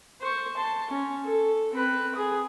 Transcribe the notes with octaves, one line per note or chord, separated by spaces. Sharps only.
C5 C#6
A5 C6
C#4
A4
C4 B4
G#4 D#6